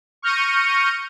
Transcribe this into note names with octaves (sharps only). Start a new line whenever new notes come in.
C#6 F6 G6 A#6 C#7 D#7